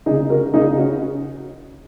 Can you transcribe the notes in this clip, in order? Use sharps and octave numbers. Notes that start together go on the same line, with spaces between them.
C#2 C#3 D#4 G#4
F#4 A#4
C#2 C#3 D#4 G#4
C#4 F#4